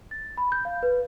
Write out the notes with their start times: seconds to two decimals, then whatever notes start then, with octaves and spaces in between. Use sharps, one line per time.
0.11 A6
0.37 B5
0.52 G6
0.65 F5
0.83 B4